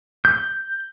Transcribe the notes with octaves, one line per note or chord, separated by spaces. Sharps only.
G6